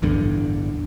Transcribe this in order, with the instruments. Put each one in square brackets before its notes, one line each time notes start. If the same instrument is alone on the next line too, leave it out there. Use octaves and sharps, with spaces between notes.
[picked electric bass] A1 E2 G2 D3